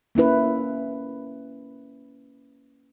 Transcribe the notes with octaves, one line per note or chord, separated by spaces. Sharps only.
A#3 C#4 E4 B4